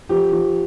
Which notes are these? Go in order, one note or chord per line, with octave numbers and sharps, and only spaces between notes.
F3 G4
F3